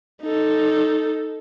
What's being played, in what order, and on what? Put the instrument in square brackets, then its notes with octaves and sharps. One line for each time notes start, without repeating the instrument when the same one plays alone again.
[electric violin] D#4 A4